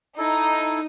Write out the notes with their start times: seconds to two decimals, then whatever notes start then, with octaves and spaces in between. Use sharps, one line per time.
0.18 D#4 E4 A4